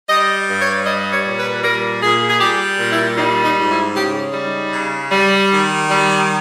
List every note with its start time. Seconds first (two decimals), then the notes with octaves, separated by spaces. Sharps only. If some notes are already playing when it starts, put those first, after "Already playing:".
0.09 G3 D#5
0.48 G2
0.60 C#5
0.86 G3 D#5
1.12 C#5
1.26 A#2
1.38 B4
1.64 G3 A#4
2.03 A#2 G#4
2.30 G#4
2.41 G3 G4
2.79 A#2
2.92 E4
3.18 G3 D#4
3.44 D#4
3.57 G#2
3.70 E4
3.96 C#3 G4
4.34 G3
4.47 D#4
4.72 C#3
5.12 G3
5.50 D#3
5.89 G3